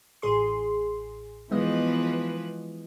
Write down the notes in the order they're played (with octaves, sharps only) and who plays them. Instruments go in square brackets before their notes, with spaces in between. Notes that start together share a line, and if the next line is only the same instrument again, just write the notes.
[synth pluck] A1 G#4 C6
[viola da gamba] E3 F3 B4 [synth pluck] G#3 B3 D#5